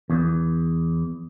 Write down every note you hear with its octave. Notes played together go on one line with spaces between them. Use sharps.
E2